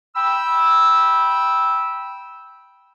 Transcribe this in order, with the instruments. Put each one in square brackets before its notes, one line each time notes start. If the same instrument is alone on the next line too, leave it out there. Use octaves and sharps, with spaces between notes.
[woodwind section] G5 B5 E6